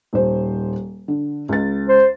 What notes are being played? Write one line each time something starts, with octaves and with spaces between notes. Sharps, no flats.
D#1 C5
D3
C#2 A6
C5